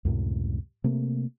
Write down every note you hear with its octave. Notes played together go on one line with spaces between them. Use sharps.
C#2 F#2 A2 C3
C3 A3 A#3